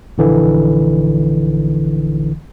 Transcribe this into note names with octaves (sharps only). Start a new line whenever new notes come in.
A#1 D3 E3